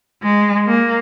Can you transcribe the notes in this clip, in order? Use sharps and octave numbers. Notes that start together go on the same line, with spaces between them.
G#3
A#3